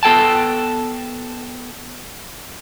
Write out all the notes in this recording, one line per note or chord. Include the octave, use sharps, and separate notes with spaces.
B3 A4 G5 A5